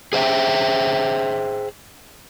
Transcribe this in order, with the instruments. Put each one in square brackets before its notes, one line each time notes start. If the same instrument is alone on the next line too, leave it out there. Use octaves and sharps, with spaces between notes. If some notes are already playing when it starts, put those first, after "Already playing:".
[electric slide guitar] G#4 C5 E5 G5